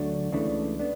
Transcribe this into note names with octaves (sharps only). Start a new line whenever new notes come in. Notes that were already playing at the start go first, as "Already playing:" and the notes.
Already playing: D2 D3 F#3 A3 D4
C#2 C#3 E3 A3 D4
B3 D4